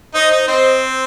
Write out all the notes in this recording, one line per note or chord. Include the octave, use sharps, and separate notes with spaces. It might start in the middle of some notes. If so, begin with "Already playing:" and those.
D#4 C5 D#5
D#4
C4 C5 D#5